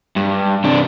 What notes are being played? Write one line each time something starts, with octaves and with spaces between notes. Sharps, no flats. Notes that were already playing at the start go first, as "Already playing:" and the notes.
G2
C3 D4